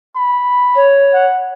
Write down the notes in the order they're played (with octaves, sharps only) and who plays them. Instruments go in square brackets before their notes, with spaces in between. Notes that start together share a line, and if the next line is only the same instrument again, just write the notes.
[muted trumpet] B5
[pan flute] C#5
[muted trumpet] F#5